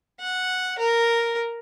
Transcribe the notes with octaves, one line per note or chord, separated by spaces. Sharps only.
F#5
A#4